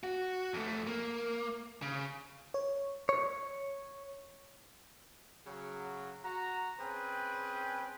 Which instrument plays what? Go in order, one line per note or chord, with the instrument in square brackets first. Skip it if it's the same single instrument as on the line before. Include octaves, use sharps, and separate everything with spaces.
[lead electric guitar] F#4
F2 A3
A#3
C#3
[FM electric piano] C#5
[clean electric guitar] C#5
[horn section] C#3 F#3
F#4 A#5
C4 C#4 G#4 B4 G5